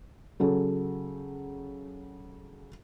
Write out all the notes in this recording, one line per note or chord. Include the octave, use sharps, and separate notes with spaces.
C#3 F#3 A4